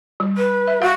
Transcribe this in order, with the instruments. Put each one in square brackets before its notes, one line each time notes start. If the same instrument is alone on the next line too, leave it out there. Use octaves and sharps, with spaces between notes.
[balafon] G3
[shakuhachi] B4
[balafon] E5
[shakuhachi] F#4 [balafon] F5